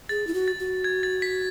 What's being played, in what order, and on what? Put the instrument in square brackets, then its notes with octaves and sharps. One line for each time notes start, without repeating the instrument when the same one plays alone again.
[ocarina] G#4 [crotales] A6
[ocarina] E4
F#4
[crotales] A6
[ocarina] F#4
[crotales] G#6
A6
B6